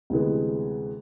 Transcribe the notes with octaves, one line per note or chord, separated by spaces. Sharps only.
D2 C3 E3 G#3 B3